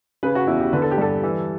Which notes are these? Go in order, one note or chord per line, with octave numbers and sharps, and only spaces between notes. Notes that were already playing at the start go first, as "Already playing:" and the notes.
C#3 B4
F#4
E2 E4
G4
D3 B4
A4
G4
G2 A4
E3